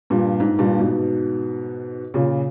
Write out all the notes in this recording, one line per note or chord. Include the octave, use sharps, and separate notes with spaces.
G2 A#2
G#2
G2 A#2
G#2 B2
A#2 C#3